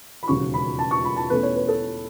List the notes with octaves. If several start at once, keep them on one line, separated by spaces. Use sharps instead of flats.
B5
E1 D#2 C#3 F#3 C#4 C#6
B5
A5
C#6
B5
A5
E2 B2 A3 C#4 B4
C#5
B4
A4